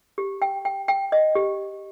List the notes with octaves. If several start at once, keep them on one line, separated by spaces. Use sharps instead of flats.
G4
G5
G5
G5
D#5
G4